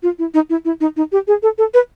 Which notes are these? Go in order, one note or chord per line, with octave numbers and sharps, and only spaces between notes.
F4
E4
D#4
E4
E4
D#4
D#4
G4
G#4
A4
A4
B4